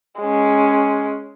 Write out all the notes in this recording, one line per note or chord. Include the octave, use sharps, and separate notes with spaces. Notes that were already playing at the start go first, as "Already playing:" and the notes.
G#3 C#4